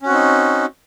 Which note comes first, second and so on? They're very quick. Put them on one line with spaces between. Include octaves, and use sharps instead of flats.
C#4 F#4 C4 D#4